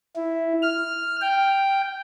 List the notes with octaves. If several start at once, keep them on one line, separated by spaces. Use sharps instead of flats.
E4
F6
G5